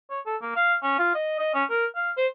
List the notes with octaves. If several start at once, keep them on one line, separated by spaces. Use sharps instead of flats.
C#5
A4
A#3
F5
C#4
F4
D#5
D#5
C#4
A#4
F5
C5